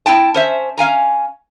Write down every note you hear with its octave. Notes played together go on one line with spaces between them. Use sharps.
C4 E4 G5 A5
C#4 C5 E5
C#4 F5 G#5 A#5